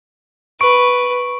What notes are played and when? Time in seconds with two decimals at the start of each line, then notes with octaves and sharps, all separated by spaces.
0.61 B4 C#6 D7